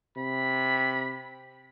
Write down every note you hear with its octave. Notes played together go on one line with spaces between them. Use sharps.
C3 B5